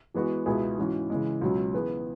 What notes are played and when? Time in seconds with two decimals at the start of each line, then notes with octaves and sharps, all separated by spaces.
0.14 E3 G#3 B3 F#4
0.46 C#2 B2 B3 E4 G#4
0.78 G#2 E3 C#4 F#4
1.10 C#3 E3 G#3
1.41 C#2 B2 F#3 C#4
1.73 E3 B3 G#4 B4